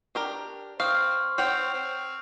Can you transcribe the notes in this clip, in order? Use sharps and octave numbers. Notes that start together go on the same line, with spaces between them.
D4 G4 A#4
C4 C5 F5 C#6 D#6 F6
C4 C#5 F#5 G5 C7 F7
C4